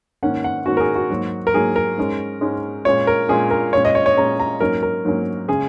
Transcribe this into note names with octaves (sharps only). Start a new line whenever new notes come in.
G#2 D#3 A#3 C#4 F#5
F#5
G#2 D#3 A#3 C#4 F#4
A#4
G#4
F#4
G#2 F#3 A#3
A#4
G#2 F#3 A#3 G#4
A#4
G#2 G#3 C#4
G#2 G#3 C#4
A#2 G#3 C#4 C#5
A#4
A#2 G#3 C#4 G#4
A#4
A#2 G#3 C#4 C#5
D#5
C#5
C#5
A#2 G#3 C#4 A#5
A#5
G#2 F#3 A#3 C#4 A#4
A#4
G#2 F#3 A#3 C#4
C#3 G#3 C#4 G#4